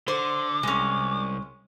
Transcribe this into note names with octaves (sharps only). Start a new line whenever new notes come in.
D3 C5 D6
C2 G#3 C#4